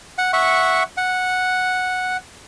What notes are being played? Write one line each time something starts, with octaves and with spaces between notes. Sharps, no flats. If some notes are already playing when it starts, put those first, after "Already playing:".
F#5
E5 F#5 C#6
F#5